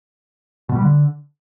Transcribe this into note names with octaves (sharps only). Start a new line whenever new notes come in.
B2
G3
D3